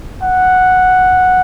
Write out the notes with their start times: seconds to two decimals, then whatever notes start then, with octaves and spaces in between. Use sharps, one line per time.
0.22 F#5